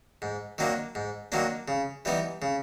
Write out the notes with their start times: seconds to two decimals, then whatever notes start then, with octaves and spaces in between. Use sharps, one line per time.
0.22 G#2
0.58 D#3 F#3 A#3 D4
0.95 G#2
1.32 D#3 F#3 A#3 D4
1.68 C#3
2.05 E3 G3 B3 D#4
2.42 C#3